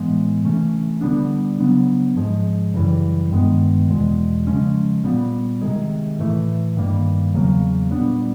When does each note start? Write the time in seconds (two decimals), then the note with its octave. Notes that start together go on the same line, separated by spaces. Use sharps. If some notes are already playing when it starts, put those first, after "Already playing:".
Already playing: A2 E3 G#3 B3
0.44 C3 E3 A3 C#4
1.01 D3 G3 B3 D4
1.59 C#3 F#3 B3 D4
2.16 G#2 F3 G#3
2.74 F#2 C#3 E3 G3
3.31 G2 D#3 G#3 B3
3.89 E2 B2 G#3
4.47 C#3 F3 G#3 C#4
5.04 A#2 G3 B3
5.62 C3 D#3 G#3
6.19 A2 E3 A3
6.77 G2 D#3 G3 A#3
7.34 E2 C#3 F#3 A#3
7.91 A#2 G3 B3 D4